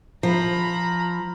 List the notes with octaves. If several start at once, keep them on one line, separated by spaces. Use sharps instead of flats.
F3 A#5 B5